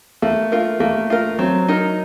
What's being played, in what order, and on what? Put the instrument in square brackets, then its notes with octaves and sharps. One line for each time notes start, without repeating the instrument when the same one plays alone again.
[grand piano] A3 [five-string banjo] A#3
[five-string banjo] F4 A#4
[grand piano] A3 [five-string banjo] A#3
[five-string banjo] F4 A#4
[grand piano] F#3 [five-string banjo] C4
[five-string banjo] D#4 A#4